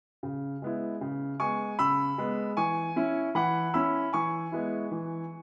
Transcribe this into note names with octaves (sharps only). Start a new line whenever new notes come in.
C#3
G#3 B3 E4
C#3
G#3 B3 G#5 C#6
C#3 B5 E6
G#3 B3
E3 G#5 C#6
C#4 E4
E3 F#5 B5
C#4 E4 B5 E6
E3 G#5 C#6
G#3 B3 E4
E3